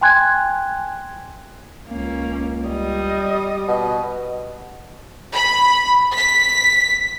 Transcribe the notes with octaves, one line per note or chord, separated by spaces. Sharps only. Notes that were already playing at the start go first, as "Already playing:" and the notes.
G5 G#5 C6 F#6 G#6
C#2 A#3 C#4
G3 D#5
B2
B5
B6